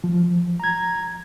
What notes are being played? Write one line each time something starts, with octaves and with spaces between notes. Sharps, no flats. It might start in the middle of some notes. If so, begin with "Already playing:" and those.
F3
A#5 G#6